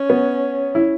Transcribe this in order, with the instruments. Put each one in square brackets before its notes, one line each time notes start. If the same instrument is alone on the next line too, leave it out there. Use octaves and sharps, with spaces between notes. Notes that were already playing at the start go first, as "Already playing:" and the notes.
Already playing: [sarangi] C#4
[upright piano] B3
E4